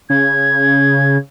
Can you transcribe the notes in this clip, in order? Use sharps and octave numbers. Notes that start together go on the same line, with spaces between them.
C#3 G#6